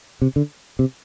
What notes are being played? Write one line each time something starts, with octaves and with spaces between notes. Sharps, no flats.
C3
D3
C3